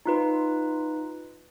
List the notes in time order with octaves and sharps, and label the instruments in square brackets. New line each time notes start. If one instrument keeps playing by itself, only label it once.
[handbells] D#4 F4 B4